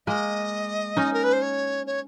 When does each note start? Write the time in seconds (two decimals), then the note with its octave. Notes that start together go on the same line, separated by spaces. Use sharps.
0.07 G#3 A#3 D#5
0.97 C#4 D#4
1.13 A#4
1.23 B4
1.32 C5
1.42 C#5
1.86 C#5